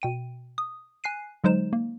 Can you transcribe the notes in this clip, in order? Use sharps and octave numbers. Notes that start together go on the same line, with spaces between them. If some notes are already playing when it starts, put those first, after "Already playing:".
B2 G5 D#7
D#6
G#5 F#6 C7 D#7
D3 F#3 G#3 D#4 C5 E7
A#3